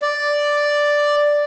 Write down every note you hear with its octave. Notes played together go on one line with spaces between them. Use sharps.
D5